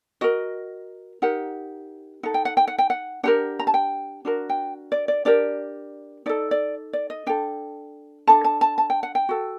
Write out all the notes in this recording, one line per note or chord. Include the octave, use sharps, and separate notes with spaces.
F#4 A#4 D#5
D#4 G4 A#4 F#5
D#4 A4 F#5
G5
F#5
G5
F#5
G5
F#5
D4 G4 A#4 F#5
A#5
A5
G5
D4 F#4 A#4
G5
D5
D5
D4 G4 A#4 D5
D#4 A4 D5
D5
D5
D#5
D4 A4 G5
D4 A4 A5
A5
A5
A5
G5
F#5
G5
F#4 A4